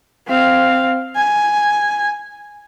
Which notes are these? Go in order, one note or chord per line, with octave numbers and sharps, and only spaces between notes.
C4 F5
G#5